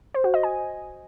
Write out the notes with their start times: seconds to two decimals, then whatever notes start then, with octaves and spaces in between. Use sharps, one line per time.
0.14 C5
0.24 F#4
0.34 D#5
0.43 G#5